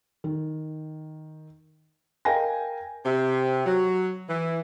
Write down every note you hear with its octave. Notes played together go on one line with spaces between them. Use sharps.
D#3
A#4 D#5 F5 G5 G#5 A#6
C3
F#3
E3